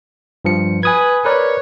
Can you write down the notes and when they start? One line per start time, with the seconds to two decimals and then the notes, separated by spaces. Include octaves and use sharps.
0.45 G2 F3 C#7
0.83 B4 G#5 D#6 G#6
1.25 A#4 B4 C#5 D5